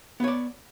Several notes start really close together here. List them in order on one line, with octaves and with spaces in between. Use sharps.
B3 C#5 D5